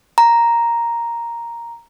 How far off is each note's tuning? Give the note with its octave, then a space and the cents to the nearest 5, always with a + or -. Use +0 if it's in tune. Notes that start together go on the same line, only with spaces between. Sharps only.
A#5 +0